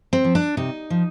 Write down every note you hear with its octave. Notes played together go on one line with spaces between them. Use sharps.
C4
F3
D4
C3 D#4
F3